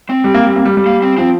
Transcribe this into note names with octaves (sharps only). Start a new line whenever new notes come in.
C4
G3
A#3
G3
A#3
G3
G3
A#3
C4
F3 C4